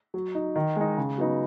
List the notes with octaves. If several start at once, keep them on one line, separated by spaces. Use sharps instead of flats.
F#3
D#4
D#3
G#3 D#4
C#3
F#3 B3 D#4